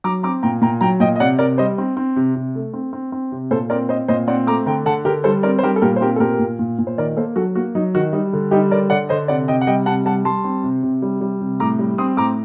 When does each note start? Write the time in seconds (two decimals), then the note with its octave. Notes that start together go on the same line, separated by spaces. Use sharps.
0.04 F#3 A#5 D6
0.23 C4 A#5 D6
0.43 A#2 G5 A#5
0.62 A#2 G5 A#5
0.81 F#3 G5 A#5
1.00 A#2 D#5 G5
1.16 D#5
1.20 C3 D5 F#5
1.39 C3 A#4 D5
1.58 G3 C5 D#5
1.78 C4
1.97 C4
2.16 C3
2.36 C3
2.55 A3
2.73 C4
2.93 C4
3.12 C4
3.32 C3
3.51 A#2 A4 C5
3.70 C4 A#4 D5
3.89 C4 C5 D#5
4.08 A#2 C5 D#5
4.27 C4 D5 F#5
4.47 A3 A#5 D6
4.66 D3 G5 A#5
4.86 D3 F#5 A5
5.05 D3 G4 A#4
5.24 G3 A4 C5
5.43 C4 A#4 D5
5.59 C5
5.63 G3 G4 A#4
5.76 A4
5.82 A#2 G4 A#4
5.96 C5
6.01 C4 G4 A#4
6.16 A4
6.20 A#2 G4 A#4
6.40 A#2
6.59 A#2
6.79 A#2
6.87 C5
6.98 D#3 A#4 D5
7.17 A#3 A4 C5
7.36 F#3 F#4 A4
7.55 A#3 F#4
7.75 F#3 D#4
7.95 D#3 F#4
8.13 G3 D#4
8.33 D3
8.51 G3 D#4 G4
8.71 D3 A#4 D5
8.90 D3 D5 F#5
9.09 D3 C5 D#5
9.28 C3 D5 F#5
9.48 C3 D#5 G5
9.61 F#5
9.67 G3 D#5 G5
9.86 C3 F#5 A5
10.05 G3 F#5 A5
10.25 G3 A5 C6
10.45 C4
10.63 C3
10.83 C3
11.02 G3
11.21 G3
11.41 C3
11.60 A2 A#5 D6
11.79 G3
11.98 C4 C6 D#6
12.17 A2 A#5 D6